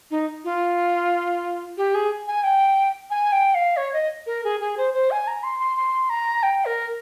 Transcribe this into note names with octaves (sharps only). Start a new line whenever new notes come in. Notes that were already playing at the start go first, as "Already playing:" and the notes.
D#4
F4
G4
G#4
G#5
G5
G#5
G5
F5
C#5
D#5
A#4
G#4
G#4
C5
C5
G#5
A#5
C6
C6
C6
A#5
G5
A#4